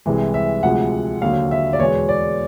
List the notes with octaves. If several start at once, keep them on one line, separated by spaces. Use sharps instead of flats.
C2 C3 E3 G#3
E5
D2 C3 F3 G#3 F#5
D#2 D3 F#3 F5
E5
D5
E2 B2 G#3 C#5
D5